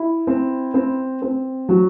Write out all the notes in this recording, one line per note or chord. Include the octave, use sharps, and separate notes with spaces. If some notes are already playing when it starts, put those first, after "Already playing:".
Already playing: E4
C4
C4
C4
F#3